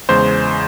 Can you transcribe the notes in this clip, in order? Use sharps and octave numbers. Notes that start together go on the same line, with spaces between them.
E2 C#3 G#3 C5